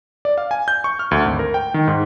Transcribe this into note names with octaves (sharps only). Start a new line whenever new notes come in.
D5
F5
G#5
G6
C#6
F6
D2
G#1
A#4
G5
D#3
G#2